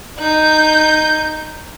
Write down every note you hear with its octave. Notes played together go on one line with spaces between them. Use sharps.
D#4 G6